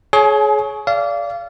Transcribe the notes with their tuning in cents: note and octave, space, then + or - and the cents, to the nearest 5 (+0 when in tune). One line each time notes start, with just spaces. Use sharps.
G#4 +30 C#5 +0 A5 -45
D5 -25 F5 -25